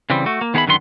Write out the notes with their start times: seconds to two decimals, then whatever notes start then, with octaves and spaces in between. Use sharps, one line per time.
0.10 C#3 E3 G3 C4
0.26 A3 F#4
0.41 A#3
0.54 D#3 B3 G#4 A#4 E5 B5
0.67 F#2 D3 D#3 B3 E4 C6